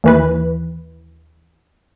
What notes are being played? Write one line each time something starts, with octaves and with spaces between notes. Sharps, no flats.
D#2 E3 B4